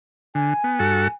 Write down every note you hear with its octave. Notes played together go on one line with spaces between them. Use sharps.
D3 G#5
B3
G2 F#4 A4